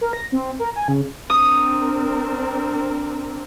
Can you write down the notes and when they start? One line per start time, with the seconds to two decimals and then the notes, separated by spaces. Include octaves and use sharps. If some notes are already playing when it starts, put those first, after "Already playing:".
0.01 A#4
0.13 A#6
0.32 C4
0.59 A#4
0.76 G#5
0.88 C#3
1.30 C4 D4 A#4 D#6